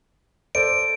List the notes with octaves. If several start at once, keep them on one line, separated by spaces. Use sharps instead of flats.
A4 C5 D5 D7